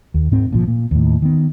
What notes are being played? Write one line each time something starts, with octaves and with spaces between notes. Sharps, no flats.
D#2
G#2 C4
G#1 A#2 C#3 F3
A#2
D#2 A2
D#3 B3